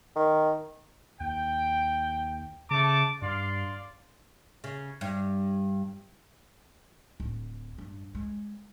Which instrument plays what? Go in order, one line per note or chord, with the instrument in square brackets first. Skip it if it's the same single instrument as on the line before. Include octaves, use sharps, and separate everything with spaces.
[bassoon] D#3
[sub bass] D#2 [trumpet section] G5
[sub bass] C#3 [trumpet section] A3 A5 D6
[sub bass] G2 [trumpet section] D5 F5 C6
[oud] C#3
G2
[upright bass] D1
G2
G#3